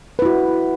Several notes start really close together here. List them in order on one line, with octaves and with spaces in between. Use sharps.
B4 E4 F#4